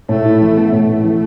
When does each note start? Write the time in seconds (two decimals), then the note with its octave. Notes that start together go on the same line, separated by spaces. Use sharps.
0.09 A2 A3
0.25 E4
0.41 E3
0.57 B3
0.72 A2 A3
0.89 E4
1.04 E3